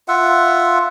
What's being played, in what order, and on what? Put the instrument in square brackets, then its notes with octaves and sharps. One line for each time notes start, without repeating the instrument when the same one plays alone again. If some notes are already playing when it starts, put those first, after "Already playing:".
[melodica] F4 E5 F#5